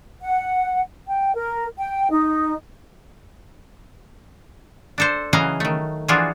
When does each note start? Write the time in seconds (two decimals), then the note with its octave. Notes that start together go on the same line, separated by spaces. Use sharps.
0.22 F#5
1.07 G5
1.35 A#4
1.77 G5
2.10 D#4
4.98 D4 A4 C5
5.33 C#3 E3 F#3 D#5 F5 A#5
5.60 D#3 A3
6.08 E3 F3 D4 F4 F#4 G#4